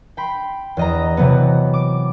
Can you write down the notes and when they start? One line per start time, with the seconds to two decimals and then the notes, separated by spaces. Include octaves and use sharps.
0.17 G5 B5 C6
0.77 E2 D#5 A#5
1.17 C3 E3 F#3 B3
1.74 D6